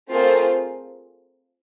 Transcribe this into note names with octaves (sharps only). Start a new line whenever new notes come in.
A3 C4 F4 G#4 A#4 C5